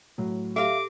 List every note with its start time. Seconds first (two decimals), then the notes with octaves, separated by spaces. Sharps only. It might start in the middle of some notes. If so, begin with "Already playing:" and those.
0.18 A2 F#3
0.56 G4 A4 E5 F5 D6